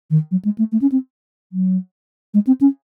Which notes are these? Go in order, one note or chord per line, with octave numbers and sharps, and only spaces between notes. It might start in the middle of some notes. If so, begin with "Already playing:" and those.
D#3
F#3
G#3
A3
A3
C#4
C4
F#3
G#3
C4
C#4